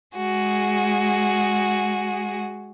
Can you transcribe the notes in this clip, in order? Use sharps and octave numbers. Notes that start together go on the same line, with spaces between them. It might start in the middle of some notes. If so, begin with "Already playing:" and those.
G#3 F#4 G#4